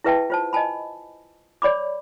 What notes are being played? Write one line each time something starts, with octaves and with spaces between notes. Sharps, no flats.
E4 G#4 B4 E5 G5 A5
F4 C5 A5
D#5 G#5 A5 B5
C#5 D5 B5 D6